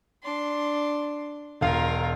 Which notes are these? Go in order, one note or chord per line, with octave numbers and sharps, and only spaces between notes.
D4 C6
E1 F4 A#4 F5